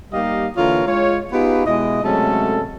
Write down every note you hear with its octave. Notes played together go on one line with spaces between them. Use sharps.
G3 A#3 D#4 G4 D#5 F5
D3 E3 A#3 F4 A#4 C#5
G#3 F4 C#5
B3 D#4 F4 G4 G#4 B4
B2 G#3 E4 D#5
C3 F#3 G#3 A3 C#4 A4